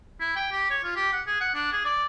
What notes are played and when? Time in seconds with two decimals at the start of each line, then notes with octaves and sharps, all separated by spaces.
0.20 E4
0.36 G5
0.52 G4
0.70 C#5
0.84 F4
0.95 G4
1.13 F#5
1.27 G#4
1.40 F#5
1.54 D4
1.72 G#4
1.85 D5